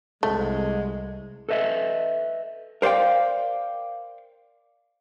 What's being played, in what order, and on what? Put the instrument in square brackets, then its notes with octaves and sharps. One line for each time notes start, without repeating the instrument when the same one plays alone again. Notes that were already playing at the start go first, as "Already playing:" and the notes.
[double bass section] C2 [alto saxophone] G#3 [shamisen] A3
[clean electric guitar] A4 B4 D#5 E5
[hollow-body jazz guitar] A#4 C5 D5 F5 G5